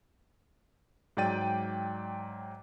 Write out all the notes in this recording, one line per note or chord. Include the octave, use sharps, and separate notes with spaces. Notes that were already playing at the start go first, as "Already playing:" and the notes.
G#2 F#3 D5 G5 A6 D#7